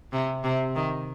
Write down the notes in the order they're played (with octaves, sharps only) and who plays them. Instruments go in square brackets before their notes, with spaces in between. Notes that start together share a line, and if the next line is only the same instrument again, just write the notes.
[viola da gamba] C3
C3
D#3